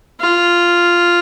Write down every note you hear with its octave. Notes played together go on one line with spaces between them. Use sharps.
F4